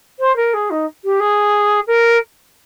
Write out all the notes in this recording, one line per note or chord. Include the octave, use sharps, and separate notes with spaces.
C5
A#4
G#4
D#4
G4
G#4
A#4